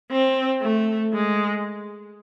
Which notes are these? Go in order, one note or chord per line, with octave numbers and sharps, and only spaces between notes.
C4
A3
G#3